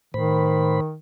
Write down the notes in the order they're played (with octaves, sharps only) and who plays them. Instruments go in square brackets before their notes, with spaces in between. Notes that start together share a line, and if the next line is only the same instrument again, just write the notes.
[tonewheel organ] A2 C5 B5 [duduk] D#3